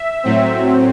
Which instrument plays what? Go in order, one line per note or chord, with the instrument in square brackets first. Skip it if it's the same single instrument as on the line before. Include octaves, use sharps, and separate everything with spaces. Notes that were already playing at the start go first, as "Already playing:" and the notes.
Already playing: [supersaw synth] E5
A2 F#3 C4